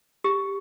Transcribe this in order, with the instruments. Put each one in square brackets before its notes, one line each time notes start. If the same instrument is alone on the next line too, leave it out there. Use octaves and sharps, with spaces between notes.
[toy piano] G4